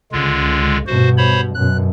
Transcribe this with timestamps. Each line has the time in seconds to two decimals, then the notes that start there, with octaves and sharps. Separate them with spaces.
0.12 C#2 D3 G#3 F4
0.87 G2 B2 F#4 C5
1.18 C5 C#5 B5
1.54 F#2 B2 F#6